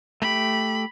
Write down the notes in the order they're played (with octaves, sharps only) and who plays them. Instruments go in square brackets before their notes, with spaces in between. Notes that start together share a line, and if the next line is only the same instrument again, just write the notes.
[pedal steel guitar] A3 G4 [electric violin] B5